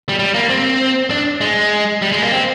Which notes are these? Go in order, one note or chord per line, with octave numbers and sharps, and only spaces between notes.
G3
G3
A#3
C4
D4
G#3
G3
G#3
A#3
C4